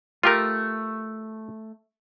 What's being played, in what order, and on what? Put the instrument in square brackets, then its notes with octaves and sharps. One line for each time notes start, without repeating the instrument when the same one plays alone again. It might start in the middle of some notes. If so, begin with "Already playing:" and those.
[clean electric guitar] A3 [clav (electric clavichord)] F4 G4 A#4